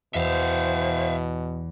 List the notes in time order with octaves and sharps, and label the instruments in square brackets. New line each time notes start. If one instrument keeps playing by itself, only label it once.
[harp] E2 [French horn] B2 [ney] C5 [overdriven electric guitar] E5 F5